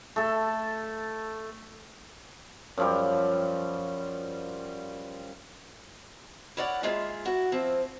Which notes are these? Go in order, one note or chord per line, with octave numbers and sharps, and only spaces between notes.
A3 A4
F#2 F3 G3
E4 A#4 C#5 D5 F#5
G#3 A#3 F4 G#4 E5
E4 F#4
F3 C4 E4